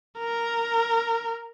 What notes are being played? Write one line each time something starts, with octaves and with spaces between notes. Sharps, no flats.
A#4